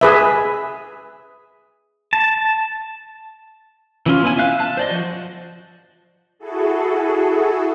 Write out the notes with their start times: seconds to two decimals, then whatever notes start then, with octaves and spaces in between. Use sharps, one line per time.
0.01 G#4 B4 E5
2.13 A5
4.06 E3 C#4 F4
4.23 B3 C#4 E4 G#5
4.38 E5 F5 F#6
4.60 A5
4.77 C5 D5 D#5
4.89 F3 F#4
6.39 E4 F#4 G#4 A4